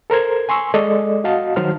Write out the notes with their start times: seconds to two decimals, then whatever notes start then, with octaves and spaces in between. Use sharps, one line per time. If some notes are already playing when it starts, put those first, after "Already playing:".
0.10 A4 A#4 C5 G#6
0.49 G#5 C6 C#6 E6
0.74 G#3 A4 D5 D#5
1.24 F#4 D#5 F5 A5
1.56 D#3 F#3 D#4 C5 A5 F6